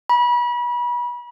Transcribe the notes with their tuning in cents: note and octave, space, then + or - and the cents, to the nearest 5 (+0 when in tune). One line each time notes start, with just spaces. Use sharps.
B5 -35